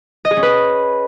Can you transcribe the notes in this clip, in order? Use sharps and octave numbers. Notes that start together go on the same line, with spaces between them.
D#5
G#4
C#4
B4